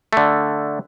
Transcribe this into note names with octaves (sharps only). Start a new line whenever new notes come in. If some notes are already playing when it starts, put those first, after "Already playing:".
D3 A3